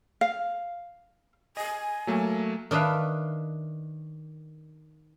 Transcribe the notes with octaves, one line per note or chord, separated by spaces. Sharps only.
F5
D#5 G#5
F#3 A3 A#3
D#3 D4 B4 E5 F5